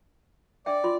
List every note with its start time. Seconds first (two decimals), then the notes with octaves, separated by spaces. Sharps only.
0.66 D4 D5 E5 G5
0.84 F4 C6